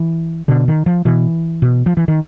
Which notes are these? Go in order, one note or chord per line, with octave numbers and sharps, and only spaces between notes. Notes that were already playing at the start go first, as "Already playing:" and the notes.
Already playing: E3
B2 D3
D#3
F3
B2 E3
B2
F3
E3
D#3